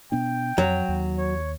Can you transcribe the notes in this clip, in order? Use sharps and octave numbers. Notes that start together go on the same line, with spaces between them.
B2 B3 D4 G5
F2 F#3
D#2
C#5